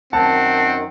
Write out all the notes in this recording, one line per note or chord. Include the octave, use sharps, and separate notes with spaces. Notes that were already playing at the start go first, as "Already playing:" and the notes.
F#2 D#3 C4 F#5 A5